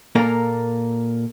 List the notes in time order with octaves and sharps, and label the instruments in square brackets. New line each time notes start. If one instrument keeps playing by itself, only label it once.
[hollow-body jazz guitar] A#2 A#3 A4 A#4 A#5